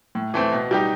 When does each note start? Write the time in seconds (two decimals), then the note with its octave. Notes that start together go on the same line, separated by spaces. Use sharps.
0.15 A2
0.34 E3 A3 C4
0.52 B2
0.71 G3 D#4 G4